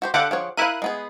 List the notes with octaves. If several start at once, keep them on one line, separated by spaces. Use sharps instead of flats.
F#4 G4 C5
D3 G4 A4 F5 F#5 D6
F3 G#4 C#5
E4 A#4 B4 F5 F#6 D#7
G#3 B3 G#4